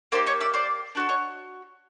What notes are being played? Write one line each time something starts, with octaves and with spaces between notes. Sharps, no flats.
A#3 D#4 G4 C5 D5
C#5 D#5
D5 E5
C5 D5
D4 F#4 A4 C5 D5
C#5 D#5